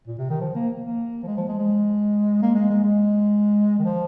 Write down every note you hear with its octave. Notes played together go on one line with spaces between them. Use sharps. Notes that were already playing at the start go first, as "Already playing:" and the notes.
A#2
C3
D#3
F3
A#3
A#3
F3
G#3
F3
G#3
G#3
A#3
G#3
G#3
G#3
D#3
F3